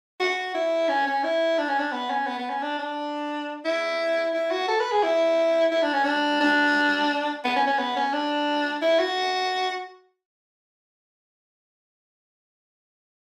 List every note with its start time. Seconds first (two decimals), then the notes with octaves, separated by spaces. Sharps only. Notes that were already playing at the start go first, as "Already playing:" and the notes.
0.20 F#4
0.55 E4
0.89 C#4
1.06 C#4
1.24 E4
1.58 D4
1.69 C#4
1.79 D4
1.92 B3
2.10 C#4
2.27 B3
2.39 B3
2.50 C#4
2.62 D4
2.79 D4
3.65 E4
4.34 E4
4.51 F#4
4.68 A4
4.80 B4
4.92 G#4
5.03 E4
5.71 E4
5.82 D4
5.94 C#4
6.04 D4
6.41 D4
7.45 B3
7.56 C#4
7.67 C#4
7.79 B3
7.96 C#4
8.13 D4
8.82 E4
8.99 F#4